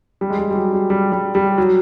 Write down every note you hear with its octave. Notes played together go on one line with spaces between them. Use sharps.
G3
G#3
G3
G3
F#3
G3
G3
G3
G3
F#3